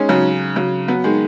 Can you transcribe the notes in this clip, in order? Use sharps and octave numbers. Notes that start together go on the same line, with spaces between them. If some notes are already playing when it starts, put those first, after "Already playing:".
Already playing: G#3 C#4 D#4
C#3 F#3
C#3 F#3
F#3 B3
D#3 G#3